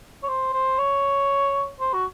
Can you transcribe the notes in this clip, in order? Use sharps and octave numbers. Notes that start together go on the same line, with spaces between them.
C#5
C5
C5
C#5
C5
F#4